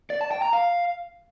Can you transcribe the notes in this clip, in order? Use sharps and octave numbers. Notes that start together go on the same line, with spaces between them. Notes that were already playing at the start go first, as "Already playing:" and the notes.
D5
A5
G5
A#5
F5